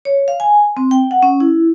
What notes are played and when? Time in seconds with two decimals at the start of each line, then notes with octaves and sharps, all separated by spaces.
0.05 C#5
0.28 F5
0.40 G#5
0.77 C4
0.91 G5
1.11 F#5
1.23 C#4
1.40 E4